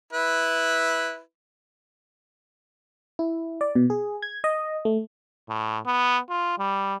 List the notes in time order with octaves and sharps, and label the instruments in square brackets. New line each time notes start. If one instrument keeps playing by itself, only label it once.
[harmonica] E4 B4
[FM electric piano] E4
D5
B2
G#4
G#6
D#5
A3
[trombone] A2
B3
F4
G3